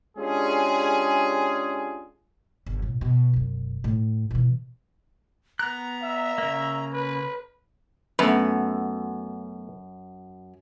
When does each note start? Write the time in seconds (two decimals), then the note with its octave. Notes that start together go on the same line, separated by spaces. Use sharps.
0.17 G#3 C#4 D4 F4 G4 G#4
2.66 G1
2.82 A1 B2
3.01 B2
3.33 E1 F#2
3.84 A2
4.31 B2 E3
5.59 B3 A#5 F#6
6.02 E5
6.38 C#3 A#3
6.93 B4
8.19 F#2 A3 B3 B4